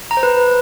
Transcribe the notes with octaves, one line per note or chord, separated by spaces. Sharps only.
A#5
C5
B4